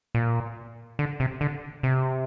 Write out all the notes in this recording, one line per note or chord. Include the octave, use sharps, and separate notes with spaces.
A#2
D3
C3
D3
C3